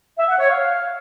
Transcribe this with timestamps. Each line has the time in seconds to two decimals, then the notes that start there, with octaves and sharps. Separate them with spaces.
0.18 E5
0.28 F#5
0.38 C#5
0.49 F5